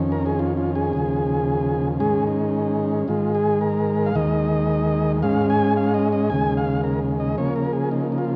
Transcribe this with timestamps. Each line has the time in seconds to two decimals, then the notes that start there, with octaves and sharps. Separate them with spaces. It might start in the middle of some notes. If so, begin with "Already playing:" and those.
Already playing: F2 D#3 C#4
0.12 A#4
0.26 G#4
0.39 F4
0.57 F4
0.75 G#4
0.93 D#2 C#3 F3
2.00 G#2 D#3 G#3 C#4 G#4
2.27 D#4
3.08 G#2 D#3 G#3 F4
3.35 G#4
3.61 A#4
4.06 F5
4.15 D#2 D#3 G#3 D#5
5.22 G#2 G#3 C#4 F5
5.50 G#5
5.77 F5
5.94 D#5
6.12 D#5
6.30 D#2 C#3 G#3 G#5
6.57 F5
6.84 A#4
7.20 D#5
7.38 C#3 F3 A#3 C#5
7.56 A#4
7.73 G#4
7.91 D#4
8.12 D#4
8.18 F4